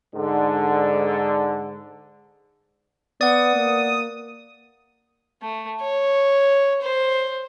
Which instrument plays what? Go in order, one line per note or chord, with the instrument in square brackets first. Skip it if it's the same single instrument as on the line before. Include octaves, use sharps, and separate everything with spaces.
[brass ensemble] G#2 D3
[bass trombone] B3 [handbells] D5 F#5 [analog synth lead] D#6
[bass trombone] A#3
[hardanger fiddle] A3
C#5
C5